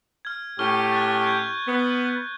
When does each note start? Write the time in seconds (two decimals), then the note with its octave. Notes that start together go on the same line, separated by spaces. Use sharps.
0.25 F6 G#6
0.59 A2 C#4 G4 C#6 F6 G7
0.92 F#6 A6
1.24 G6 G#6
1.66 B3